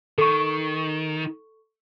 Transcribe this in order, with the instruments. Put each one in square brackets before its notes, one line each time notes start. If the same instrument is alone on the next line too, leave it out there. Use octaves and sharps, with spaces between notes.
[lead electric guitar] D#3 [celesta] A4 C#6